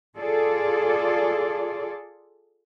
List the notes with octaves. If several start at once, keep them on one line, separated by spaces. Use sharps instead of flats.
F4 G#4 A4 D5